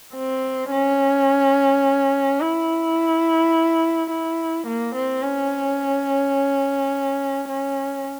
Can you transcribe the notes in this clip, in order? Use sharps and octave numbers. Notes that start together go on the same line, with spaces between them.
C4
C#4
E4
E4
A#3
C4
C#4
C#4